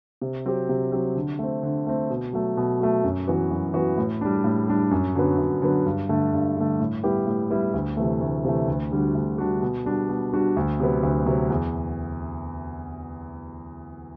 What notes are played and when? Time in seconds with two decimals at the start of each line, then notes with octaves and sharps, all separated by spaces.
0.21 C3
0.45 F#3 C4 G4
0.69 C3
0.92 F#3 C4 G4
1.15 D3
1.39 A3 C4
1.63 D3
1.87 A3 C4
2.10 B2
2.33 F#3 A3
2.57 B2
2.80 F#3 A3
3.04 F#2
3.27 E3 B3 F#4
3.51 F#2
3.74 E3 B3 F#4
3.98 A2
4.21 G3 D4
4.44 A2
4.68 G3 D4
4.91 F#2
5.15 D3 F#3 B3
5.38 F#2
5.62 D3 F#3 B3
5.85 G2
6.09 D3 A3
6.33 G2
6.57 D3 A3
6.80 A2
7.04 G3 B3 E4 G4
7.27 A2
7.50 G3 B3 E4 G4
7.74 D2
7.97 C3 E3 A3
8.21 D2
8.44 C3 E3 A3
8.68 D2
8.91 D3 G3 D4 F#4
9.15 D2
9.38 D3 G3 D4 F#4
9.62 B2
9.85 G3 D4 F#4
10.09 B2
10.33 G3 D4 F#4
10.57 D2
10.80 C3 F#3 B3
11.03 D2
11.26 C3 F#3 B3
11.50 E2